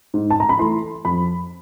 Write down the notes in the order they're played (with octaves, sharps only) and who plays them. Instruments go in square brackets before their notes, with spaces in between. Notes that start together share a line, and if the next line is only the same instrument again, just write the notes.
[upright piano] G#2
A5
A#5
B5
E3 A3 C6
F2 B5